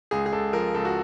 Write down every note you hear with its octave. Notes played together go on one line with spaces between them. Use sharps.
C#2 G#4
G#4
C#2 A4
F3 A#4
C#2 A4
F#4